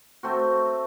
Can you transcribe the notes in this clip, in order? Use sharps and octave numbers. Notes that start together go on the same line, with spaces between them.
A3 C4 F#4